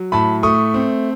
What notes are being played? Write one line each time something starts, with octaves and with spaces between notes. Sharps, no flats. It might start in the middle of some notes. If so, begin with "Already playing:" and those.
Already playing: F#3
A2 A5 B5
A3 C#6 D#6
C4